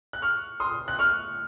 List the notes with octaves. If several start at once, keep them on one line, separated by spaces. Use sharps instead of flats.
F#6
C#6 F6
C6 D#6
F#6
C#6 F6